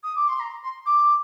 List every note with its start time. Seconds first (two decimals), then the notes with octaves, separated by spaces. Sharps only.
0.03 D#6
0.16 D6
0.28 C6
0.40 A#5
0.63 C6
0.86 D6